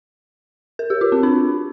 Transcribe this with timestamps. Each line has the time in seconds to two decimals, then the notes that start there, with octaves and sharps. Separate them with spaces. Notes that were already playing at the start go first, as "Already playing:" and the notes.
0.79 A#4
0.90 G4
1.01 F4
1.12 C4
1.23 D4